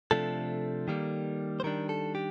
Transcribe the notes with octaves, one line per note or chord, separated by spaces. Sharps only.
C3 F3 A3 D4 A4
D#3 G3 A#3
C5
D#3 G3 D4 A#4
A4
G4